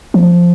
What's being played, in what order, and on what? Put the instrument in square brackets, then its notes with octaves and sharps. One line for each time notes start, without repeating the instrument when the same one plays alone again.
[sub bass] F3